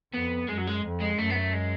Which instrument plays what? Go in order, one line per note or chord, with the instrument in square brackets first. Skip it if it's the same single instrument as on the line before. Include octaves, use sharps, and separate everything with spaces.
[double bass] F2 [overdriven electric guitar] B3
[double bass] F#2 [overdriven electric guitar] G#3
[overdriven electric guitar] F#3
G#3
[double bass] F2
[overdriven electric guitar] G#3
[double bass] F#2 [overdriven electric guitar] A3
[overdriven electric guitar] B3
A3
G#3